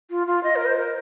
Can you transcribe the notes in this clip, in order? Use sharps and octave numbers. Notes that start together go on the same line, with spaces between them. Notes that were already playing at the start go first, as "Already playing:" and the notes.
F4
F4
D#5
A#4
C5
A#4